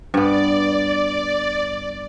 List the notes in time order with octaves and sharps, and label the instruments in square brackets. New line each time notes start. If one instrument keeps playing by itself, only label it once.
[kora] G2 B3 [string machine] D5